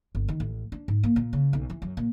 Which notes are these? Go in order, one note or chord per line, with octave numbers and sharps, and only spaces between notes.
G1
D#3
A1
D4
G#2
A#3
A#2
C#3
B1
E3
F#2
A#2